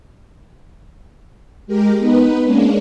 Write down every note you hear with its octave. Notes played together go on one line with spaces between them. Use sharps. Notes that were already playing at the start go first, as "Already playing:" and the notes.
G#3 G4 A#4
B3 D#4 B4
G#3 A#3 C#4 D4